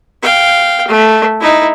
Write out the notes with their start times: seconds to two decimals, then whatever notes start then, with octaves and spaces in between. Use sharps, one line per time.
0.23 F5 G5
0.88 A3
1.40 D#4 E4